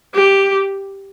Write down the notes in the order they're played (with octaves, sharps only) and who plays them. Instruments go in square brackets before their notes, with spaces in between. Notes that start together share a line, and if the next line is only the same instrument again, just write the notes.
[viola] G4